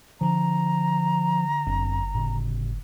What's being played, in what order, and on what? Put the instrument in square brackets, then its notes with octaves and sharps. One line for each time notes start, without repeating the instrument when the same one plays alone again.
[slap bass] D3 D4 [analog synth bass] F3 [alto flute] A#5
[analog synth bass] G1 [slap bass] F#2 C4 D4
[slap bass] A2 C#3